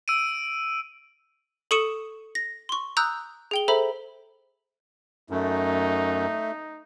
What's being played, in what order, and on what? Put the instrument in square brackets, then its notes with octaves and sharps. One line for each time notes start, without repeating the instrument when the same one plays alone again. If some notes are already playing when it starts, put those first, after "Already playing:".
[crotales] E6 D7 D#7
[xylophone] A4 C#6 D#6 C#7 D#7 E7
A#6
C6 C#6
A#5 D#6 E6 F#6 G6
G#4 G5 G7
A4 C5 E5 A#5 B5
[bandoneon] F#2 [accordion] A3 [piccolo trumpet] D#4